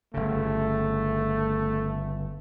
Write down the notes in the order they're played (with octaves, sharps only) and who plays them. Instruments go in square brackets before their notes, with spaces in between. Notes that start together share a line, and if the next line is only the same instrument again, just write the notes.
[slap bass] G1 C#3 [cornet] A3